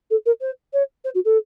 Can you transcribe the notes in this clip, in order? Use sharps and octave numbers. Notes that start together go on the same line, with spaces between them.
A4
A#4
C5
C#5
C5
F#4
A4